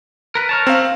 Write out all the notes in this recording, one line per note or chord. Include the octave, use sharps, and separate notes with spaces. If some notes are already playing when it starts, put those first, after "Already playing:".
A#4 B4
A#4 C#5 A5
C4 F5